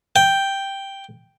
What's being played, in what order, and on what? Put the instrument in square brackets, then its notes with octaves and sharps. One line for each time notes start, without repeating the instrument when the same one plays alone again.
[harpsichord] G5